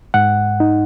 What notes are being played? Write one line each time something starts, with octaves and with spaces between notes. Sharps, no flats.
G#2 F#5
D#4